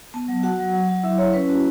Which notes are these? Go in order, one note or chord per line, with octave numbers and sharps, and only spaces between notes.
B3 A5
F#3
F#4 F#5
F#3
F#3
F#3
E4 E5
E4 C#5
C#4 B4
F#4